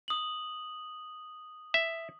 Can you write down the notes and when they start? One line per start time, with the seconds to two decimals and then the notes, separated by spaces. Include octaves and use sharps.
0.08 D#6 F#7
1.74 E5